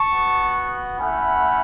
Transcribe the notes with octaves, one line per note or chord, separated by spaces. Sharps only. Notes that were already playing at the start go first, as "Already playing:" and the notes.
Already playing: A5 C#6
B3 F#4
A3 C#4 E4 F#5 B5